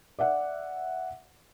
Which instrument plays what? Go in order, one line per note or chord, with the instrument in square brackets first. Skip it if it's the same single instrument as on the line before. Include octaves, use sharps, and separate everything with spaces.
[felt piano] D5 E5 F#5